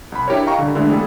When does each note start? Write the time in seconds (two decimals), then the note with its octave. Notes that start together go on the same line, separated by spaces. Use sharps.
0.12 C2 B5
0.28 D4 E4 G4 A#4 C#5
0.46 D#5 F5 G5 A#5 C#6
0.59 D3 G3
0.75 D3 E3 G#3 A3 D4 E4
0.89 G3 A#3 G#4 A4